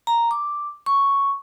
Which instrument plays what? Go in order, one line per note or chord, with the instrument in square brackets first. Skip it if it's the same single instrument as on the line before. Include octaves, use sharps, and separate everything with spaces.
[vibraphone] A#5
D6
C#6